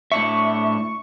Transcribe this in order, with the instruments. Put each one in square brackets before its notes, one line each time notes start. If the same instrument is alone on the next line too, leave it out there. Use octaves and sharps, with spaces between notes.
[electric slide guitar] A2 D4 E5 [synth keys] C#6